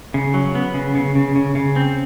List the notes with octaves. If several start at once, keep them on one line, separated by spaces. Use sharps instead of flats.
C#3
F#3
B3
C#3
C#3
C#3
C#3
C#3
C4